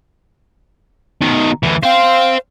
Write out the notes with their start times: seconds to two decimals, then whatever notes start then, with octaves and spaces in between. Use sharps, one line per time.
1.22 B2 D#3
1.63 D2 E3
1.83 C5 F5 G5